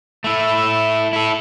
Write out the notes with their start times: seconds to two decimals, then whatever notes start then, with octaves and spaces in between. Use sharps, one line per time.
0.24 A3 E4
1.13 E4 A4